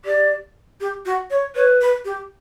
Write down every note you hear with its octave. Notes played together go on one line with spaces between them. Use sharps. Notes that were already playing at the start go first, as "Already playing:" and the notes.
G4 D5
G4
F#4
C#5
B4 C#5
B4
G4